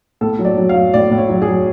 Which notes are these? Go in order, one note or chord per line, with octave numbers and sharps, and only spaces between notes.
A2 A4
F#3
D5
F#3
F5
F#3
A2 D5
A2
C#5
F#3
G#4
F#3